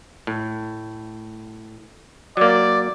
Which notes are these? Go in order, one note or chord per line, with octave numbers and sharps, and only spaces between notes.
A2
F#3 A#3 D5